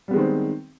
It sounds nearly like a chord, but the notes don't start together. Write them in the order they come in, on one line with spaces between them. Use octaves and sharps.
G3 B3 G#3 D#3 C4